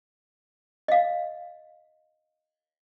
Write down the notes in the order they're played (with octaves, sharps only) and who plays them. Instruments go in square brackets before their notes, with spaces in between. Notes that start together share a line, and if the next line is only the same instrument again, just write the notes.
[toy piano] D#5 F5